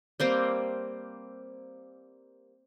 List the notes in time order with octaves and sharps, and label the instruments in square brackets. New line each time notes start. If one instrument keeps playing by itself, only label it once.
[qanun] G3 A#3 C4